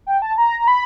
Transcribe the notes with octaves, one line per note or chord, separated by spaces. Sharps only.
G5
A5
A#5
A#5
B5